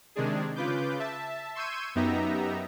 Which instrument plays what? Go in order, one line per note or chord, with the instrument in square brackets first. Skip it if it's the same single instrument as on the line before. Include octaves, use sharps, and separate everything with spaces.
[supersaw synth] C3 D#3 G#3 D4 G#4
C#3 F4 B4 D6 G6
E5 A5
C6 C#6 E6 G6 G#6 D#7
F#2 B3 D#4 G4 E5 A#5